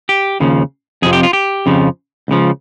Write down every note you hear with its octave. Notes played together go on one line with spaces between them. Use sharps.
G4
D#2 C#3 F3
F2 C3 F3 G#4
G4
F4
G4
F2 C#3 F3
C#2 C#3 F3